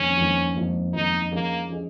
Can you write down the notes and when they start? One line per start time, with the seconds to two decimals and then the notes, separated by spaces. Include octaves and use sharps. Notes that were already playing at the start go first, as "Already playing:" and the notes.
Already playing: F2 D#3 A#3 C#4
0.18 F2 D#3 A#3
0.56 F2 D#3 A#3
0.94 F2 D#3 A#3 D#4
1.31 F3 A#3 C#4 G#4 D#5
1.69 F3 C#4 G#4 D#5